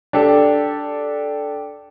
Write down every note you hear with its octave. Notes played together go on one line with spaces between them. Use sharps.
D4 G4 A4